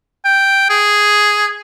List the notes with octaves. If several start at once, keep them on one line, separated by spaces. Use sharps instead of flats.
G5
G#4